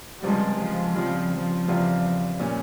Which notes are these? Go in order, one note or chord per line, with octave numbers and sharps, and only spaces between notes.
C#2 C3 F3 G3 G#3
F3
C#3 F3 G3 C4
F3
E2 C#3 G3 C4 F4
A#2 G3 C#4